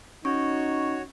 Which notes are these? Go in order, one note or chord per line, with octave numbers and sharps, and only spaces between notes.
C#4 D#4 F#4 C#5 C#6